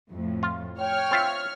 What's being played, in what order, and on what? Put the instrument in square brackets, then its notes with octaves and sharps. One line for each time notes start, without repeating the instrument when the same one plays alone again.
[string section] F2 A2
[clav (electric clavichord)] F4
[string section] C#5 F6 [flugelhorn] G5
[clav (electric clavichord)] C4 F4 E5